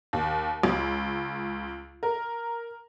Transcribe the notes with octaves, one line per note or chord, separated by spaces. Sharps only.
D#2
C#2
A#4